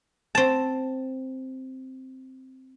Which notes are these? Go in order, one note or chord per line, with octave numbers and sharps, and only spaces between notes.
C4 A5